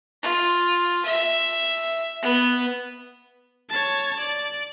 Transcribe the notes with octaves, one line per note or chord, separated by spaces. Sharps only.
F4
E5
B3
C#5 A5
D5